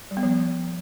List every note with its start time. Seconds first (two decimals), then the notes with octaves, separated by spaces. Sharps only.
0.11 G3
0.17 B3
0.23 F3